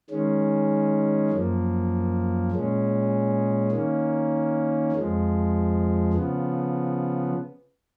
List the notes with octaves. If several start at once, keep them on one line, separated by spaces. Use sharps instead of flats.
D#3 G#3 C#4
F#2 F3 A#3
A#2 G#3 C#4
D#3 A#3 C#4
F2 F3 G#3
C#3 F3 B3